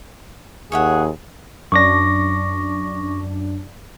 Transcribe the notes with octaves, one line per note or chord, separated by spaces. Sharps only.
D#2 G#4 C#5 E5 F#5
F#2 D4 C#6 D6 A#6